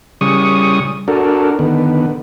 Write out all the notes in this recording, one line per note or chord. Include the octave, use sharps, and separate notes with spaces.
C#3 G3 C#6 D#6
D4 F#4 A4 A#4
D3 D#3 B3